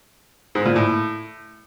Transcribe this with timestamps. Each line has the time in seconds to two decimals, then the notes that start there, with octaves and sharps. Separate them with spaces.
0.55 G#2
0.65 A#2
0.76 A2